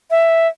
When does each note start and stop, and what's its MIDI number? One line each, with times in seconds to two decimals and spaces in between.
0.11 0.48 76